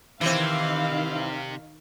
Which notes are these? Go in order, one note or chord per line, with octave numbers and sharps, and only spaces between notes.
C3 D#3 E3 C4 F5